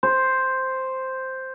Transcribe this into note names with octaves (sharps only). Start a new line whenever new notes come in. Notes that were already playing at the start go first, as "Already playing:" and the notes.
C5